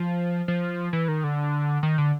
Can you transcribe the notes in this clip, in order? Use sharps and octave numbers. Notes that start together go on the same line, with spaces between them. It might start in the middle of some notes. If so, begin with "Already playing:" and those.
Already playing: F3
F3
E3
D#3
D3
D#3
D3